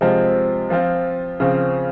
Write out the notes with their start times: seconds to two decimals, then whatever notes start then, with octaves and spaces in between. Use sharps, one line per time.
0.01 C3 F3 G#3 C4 F4
0.70 F3 C4 F4
1.40 C#3 F3 C4